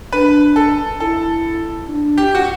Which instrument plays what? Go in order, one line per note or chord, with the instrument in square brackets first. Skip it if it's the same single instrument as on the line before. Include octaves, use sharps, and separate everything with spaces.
[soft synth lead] D4 [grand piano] B4
[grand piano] A4
[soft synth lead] E4 [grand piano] A4
[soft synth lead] D4
[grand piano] G4
F#4